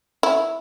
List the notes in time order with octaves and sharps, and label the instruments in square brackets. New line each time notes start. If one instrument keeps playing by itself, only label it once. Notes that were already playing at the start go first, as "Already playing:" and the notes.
[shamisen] E4